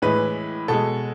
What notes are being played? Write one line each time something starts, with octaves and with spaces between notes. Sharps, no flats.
A2 E3 G#3 B4
B2 G#3 A4